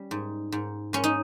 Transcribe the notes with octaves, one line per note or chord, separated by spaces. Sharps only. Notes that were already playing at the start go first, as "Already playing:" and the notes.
Already playing: G3 C#4
G#2
G#2
G#2 C#4
D#4